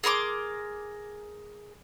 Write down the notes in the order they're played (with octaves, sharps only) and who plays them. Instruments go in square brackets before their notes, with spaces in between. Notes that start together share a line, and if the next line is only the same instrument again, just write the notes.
[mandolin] G#4 A#4 C6 D6